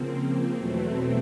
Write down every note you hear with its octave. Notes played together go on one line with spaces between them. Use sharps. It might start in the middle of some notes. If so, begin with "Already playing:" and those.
Already playing: C#3 F3 A#3 C4
E2 B2 F#3 A3